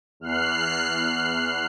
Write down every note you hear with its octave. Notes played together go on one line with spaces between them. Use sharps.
E2 F6 F#6 C7